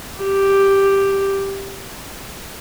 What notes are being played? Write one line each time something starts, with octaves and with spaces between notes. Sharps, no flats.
G4